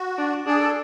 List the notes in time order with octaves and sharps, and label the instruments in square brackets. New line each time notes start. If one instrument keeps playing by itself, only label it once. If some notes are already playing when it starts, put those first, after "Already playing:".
Already playing: [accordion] F#4
[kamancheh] D4
[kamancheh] D4 [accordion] G#4
[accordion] A4